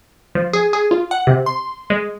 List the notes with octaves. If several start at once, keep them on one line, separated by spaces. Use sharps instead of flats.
F3
G#4
G#4
F4
F#5
C3
C6
G#3